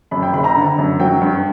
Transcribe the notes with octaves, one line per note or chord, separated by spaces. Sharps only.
F#2 B5
G5
F#1 B5
A#5
D3
F#2
F#3 G5
G2